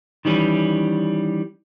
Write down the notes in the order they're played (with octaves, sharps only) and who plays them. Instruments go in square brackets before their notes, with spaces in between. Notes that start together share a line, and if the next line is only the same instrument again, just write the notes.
[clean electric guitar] D#3 E3 G3 C#4